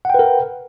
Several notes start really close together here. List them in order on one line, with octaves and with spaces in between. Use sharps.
F#5 G5 B4 A#4